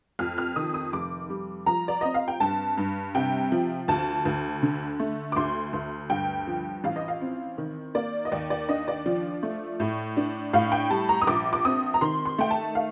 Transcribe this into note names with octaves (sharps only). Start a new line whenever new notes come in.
F2 F6
F6
D#3 D#6
D#6
F1 D6
G3
F3 A#5
D5
C4 D#5
F5
G5
G2 A5
G2
C3 G5
F3
D2 A5
D2
D3
A3
D6
D2 C6
D2
G2 G5
F3
A1 F5
D#5
F5
C4
D#3
A#3 D5
D#5
D#2 D5
D5
D4 D#5
D5
F3
A3
A2
D4
A2 F5
G5
G3 A5
A#5
D#6
A#1 D6
D6
C4 D#6
A#5
D#3 C6
C6
A3 G5
A5
F5